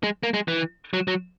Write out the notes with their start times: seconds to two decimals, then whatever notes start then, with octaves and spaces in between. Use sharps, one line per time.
0.04 G#3
0.23 A#3
0.34 G#3
0.48 E3
0.93 F#3
1.08 F#3